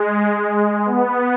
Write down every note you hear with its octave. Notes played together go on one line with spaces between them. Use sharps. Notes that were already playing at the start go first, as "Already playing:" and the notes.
Already playing: G#3
B3